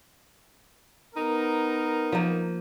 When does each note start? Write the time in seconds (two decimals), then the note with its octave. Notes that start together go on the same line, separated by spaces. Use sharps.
1.15 B3 D#4 A#4
2.12 F3 A#3